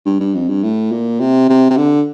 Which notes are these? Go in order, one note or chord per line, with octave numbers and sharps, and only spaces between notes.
G2
G2
F2
G2
A2
A#2
C3
C3
C3
D3